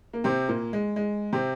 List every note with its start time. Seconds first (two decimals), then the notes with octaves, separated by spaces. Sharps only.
0.13 A#3
0.24 C3 C4
0.49 A#2 A#3
0.73 G#3
0.96 G#3
1.33 C3 C4